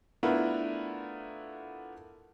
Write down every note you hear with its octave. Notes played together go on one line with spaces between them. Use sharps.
A3 B3 D4 E4 F4 A#4